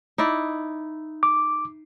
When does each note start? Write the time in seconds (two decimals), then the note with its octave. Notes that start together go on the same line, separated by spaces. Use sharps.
0.18 D#4 E4 D5
1.23 D6